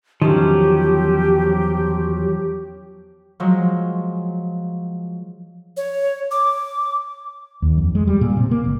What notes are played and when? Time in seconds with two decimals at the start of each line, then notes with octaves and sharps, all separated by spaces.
0.22 E2 D#3 F3 F#3 C#4 G4
3.40 F3 F#3 G#3
5.77 C#5
6.31 D6
7.62 D#2
7.78 F2
7.95 G#3
8.07 G3
8.21 A#2
8.37 C3
8.51 A#3
8.65 G1